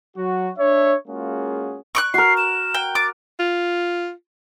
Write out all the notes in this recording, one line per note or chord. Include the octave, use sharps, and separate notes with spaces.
F#3 F#4
D4 C#5 E5
G#3 A#3 C#4 F4 F#4 G#4
C#6 D6 F#6
F#4 A#4 C7
E7
G5
D6 A6
F4